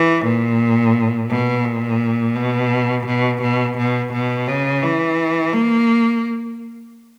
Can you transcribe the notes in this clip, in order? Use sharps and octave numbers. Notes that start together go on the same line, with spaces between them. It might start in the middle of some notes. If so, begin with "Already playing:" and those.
Already playing: E3
A#2
B2
A#2
B2
B2
B2
B2
B2
C#3
E3
A#3